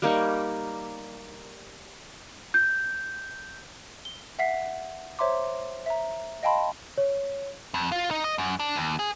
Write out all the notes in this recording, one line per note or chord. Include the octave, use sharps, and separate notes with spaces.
G3 A#3 D#4 C#6
G6
G7
E5 F#5 B6 C7
C5 C#5 E5 A#5 C6 D6
E5 A#5
D#5 F5 G5 A5 B5 C6
C#5
F2
F4
D#4
D#5
F#2
D4
D#2
G#4